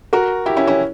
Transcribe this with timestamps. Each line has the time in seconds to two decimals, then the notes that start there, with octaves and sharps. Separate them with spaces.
0.13 F#4 A#4
0.46 E4 G4
0.57 C#4 E4
0.67 C#4 E4